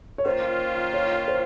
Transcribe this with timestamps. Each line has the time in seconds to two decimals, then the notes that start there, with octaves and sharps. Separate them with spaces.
0.18 C#5
0.25 D#3 A#3 C#4 F4 C5
0.93 C#5
1.28 C5